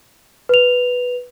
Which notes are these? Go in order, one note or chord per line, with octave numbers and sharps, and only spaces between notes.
B4 F7